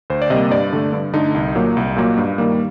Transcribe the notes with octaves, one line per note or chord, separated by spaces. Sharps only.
D2 C5
D5
C3 G3 A#3 D#5
G2 D5
D3 A3
G2
D3 A3 D#4
C2
A#2 F#3 A#3
C2
A#2 F#3 A#3
G2
D#3 G3 A#3